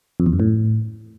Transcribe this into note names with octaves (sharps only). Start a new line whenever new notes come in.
F2
E2
F#2
A2